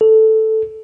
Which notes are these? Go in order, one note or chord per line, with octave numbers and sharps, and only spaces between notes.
A4